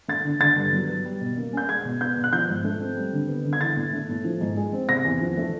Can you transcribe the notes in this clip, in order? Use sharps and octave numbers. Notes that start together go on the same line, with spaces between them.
A3 A6
D3
D3 A6
G2
F#3
B3
G3
B2
A#3
C#4 G6
G#3 G#6
B2
B3 G6
B2
F#6
F3 G6
G#2
A3
C4
G3
D3
B3
D3
G#6
E3 A6
A2
A3
A2
F3
G#2
G#3
C4
C3 A#6
E2
F3
A3